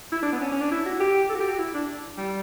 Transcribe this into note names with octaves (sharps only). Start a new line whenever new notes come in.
E4
D4
B3
C#4
C#4
D4
E4
F#4
G4
A4
F#4
G4
F#4
E4
D4
G3